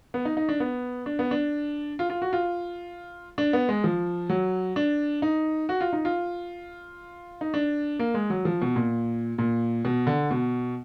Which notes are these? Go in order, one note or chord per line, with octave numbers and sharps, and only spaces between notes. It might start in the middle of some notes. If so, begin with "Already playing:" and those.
B3
D#4
D#4
D4
B3
D4
B3
D4
F4
F4
F#4
F4
D4
B3
G#3
F3
F#3
D4
D#4
F#4
F4
D#4
F4
D#4
D4
A#3
G#3
F#3
F3
B2
A#2
A#2
B2
D3
B2